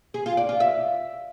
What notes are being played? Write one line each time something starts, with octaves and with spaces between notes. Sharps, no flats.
G#4
F4
D5
F4
E5